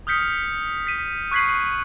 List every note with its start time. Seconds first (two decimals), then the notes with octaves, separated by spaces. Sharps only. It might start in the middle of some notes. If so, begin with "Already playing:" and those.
0.07 D#6 F6 G6 B6 C#7
0.87 B6 D#7
1.31 C#6 F#6 G#6 B6 C7 F#7